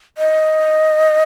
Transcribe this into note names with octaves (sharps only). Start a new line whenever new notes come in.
D#5